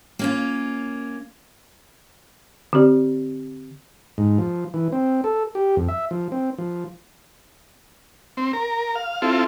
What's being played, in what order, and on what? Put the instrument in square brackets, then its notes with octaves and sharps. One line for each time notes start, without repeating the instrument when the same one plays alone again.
[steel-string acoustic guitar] A#3 C#4 F4
[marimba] D3 C4 G4 D5
[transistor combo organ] G#2
F3
E3
C4
A4
G4
F2
E5
F3
C4
F3
C4
A#4
F5
C4 E4 F4 A4